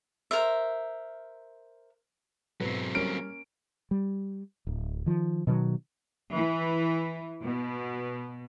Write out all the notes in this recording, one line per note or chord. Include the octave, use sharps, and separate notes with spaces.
A#4 C5 E5
G#2 B2 F#3 C4 B4
G3 A#3 C#4 F6 D7
G3
D1
D#3 F3
B2 D#3 F#3
E3
B2